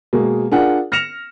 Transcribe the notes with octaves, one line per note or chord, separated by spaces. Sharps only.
B2 G#3 A#3
D4 F4 G#4 A#4 F#5
F6 A#6 C#7 E7 F7